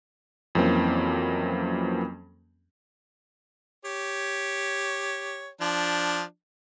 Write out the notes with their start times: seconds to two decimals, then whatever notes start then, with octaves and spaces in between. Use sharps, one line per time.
0.55 F2 E3 F#3 A#3 C4 C#4
3.85 G4 C#5
5.61 F3 D4